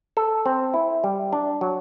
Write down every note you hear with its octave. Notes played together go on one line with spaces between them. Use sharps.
A4
C4
E4
G3
D4
F#3